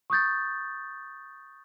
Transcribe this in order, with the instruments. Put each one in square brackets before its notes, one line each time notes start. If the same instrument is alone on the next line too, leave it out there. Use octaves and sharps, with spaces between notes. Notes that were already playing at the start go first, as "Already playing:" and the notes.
[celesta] C#6 D#6 G6 A6